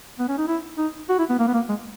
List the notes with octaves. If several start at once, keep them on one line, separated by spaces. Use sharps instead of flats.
B3
C#4
D#4
E4
D#4
F#4
E4
B3
A#3
B3
A#3
G#3